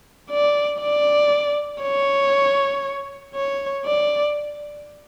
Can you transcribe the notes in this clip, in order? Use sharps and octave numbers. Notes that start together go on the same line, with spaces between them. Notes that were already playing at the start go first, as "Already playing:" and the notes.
D5
D5
C#5
C#5
D5